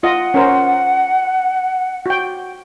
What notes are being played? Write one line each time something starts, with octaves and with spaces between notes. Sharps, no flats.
F4 D#5 F#5
C#4 A#4 C5
F#4 G5